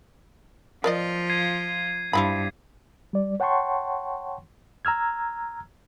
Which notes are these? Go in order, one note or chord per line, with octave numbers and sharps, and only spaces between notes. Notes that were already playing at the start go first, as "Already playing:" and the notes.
F3 F4 A#4 D5 D#5
G#6 C7 D#7
G2 F3 E4 B5
G3 D5
C#5 F#5 G5 A5 C6 C#6
A#5 E6 F6 G#6